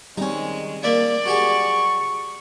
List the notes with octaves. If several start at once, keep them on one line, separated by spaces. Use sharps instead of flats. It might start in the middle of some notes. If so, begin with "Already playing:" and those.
D#3 G3 G#3 C4 C#4 D#4
A#3 D5 E5
F#3 G4 G#4 C#6